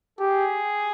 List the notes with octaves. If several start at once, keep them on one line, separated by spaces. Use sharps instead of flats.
G4 G#4